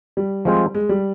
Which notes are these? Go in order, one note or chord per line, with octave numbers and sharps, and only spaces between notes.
G3
F3 G#3 C4 F4 C5
G#3
G3